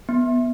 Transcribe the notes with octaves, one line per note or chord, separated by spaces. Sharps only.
B3